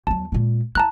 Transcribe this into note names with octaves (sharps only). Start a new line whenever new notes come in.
E2 F#3 A5
A#2 G#3
E4 A5 A#5 F#6